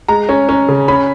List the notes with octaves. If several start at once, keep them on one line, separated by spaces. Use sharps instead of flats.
G#3 A#5
C#4
C#4
C#3
C#4 B5